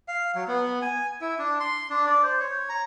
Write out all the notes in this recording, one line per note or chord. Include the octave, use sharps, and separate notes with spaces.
F5
F#3
B3
G#5
E4
D4
C6
D4
D5
C5
C#5
A#5